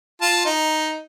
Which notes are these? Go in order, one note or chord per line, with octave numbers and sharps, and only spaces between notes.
F4 A5
D#4